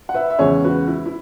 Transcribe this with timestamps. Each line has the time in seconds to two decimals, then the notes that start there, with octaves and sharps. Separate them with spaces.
0.09 F#5
0.14 B4 E5
0.30 E5
0.39 E2 C#3 E3 G#3 G#4 C#5
0.64 F#4 B4
0.88 E4
1.06 E4